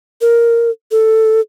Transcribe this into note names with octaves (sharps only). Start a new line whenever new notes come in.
A#4
A4